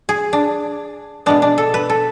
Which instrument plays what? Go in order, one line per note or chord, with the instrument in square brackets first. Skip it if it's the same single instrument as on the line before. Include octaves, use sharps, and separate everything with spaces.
[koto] G#4
D4
B2 G#3 B3 D4
D4
A4
B4
A4